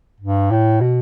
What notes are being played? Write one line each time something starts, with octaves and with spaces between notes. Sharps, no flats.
G2
A2
B2